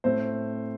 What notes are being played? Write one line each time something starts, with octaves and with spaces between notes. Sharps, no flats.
A2 A3 C4 C5